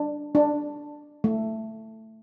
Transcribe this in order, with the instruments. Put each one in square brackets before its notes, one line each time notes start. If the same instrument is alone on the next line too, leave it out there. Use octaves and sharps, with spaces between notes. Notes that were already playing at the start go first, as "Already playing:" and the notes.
Already playing: [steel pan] D4
D4
A3